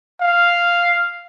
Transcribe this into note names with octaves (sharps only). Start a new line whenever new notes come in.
F5